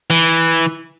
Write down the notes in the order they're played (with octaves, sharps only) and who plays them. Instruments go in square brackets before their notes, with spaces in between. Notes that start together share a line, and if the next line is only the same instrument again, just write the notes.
[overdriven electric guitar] E3